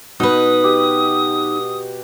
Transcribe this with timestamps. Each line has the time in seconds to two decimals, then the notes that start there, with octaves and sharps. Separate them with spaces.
0.20 B2 D#4 B4 D#6
0.64 G4